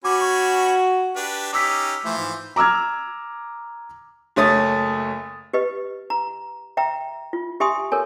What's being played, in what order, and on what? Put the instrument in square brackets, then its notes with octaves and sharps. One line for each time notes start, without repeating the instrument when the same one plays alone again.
[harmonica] C#4 G#5 B5 [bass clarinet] F#4 [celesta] D6
[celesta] C#6
[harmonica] D4 G4 B4
[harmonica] C#4 D#4 G4 [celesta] D6 E6 B6
[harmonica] E3 F3 C5 [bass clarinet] A3
[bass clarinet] G#2
[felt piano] A#5 D6 E6 F6 G#6
[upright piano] F#1 A3 C#5 D#6 A6
[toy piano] G4 B4 D#5
A#5
E5 G5 A#5
F4
G4 E5 G#5 C6 D#6
A4 A#4 C#5 G#5